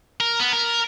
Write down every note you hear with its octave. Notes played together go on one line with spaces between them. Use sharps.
A#4
B3
A#4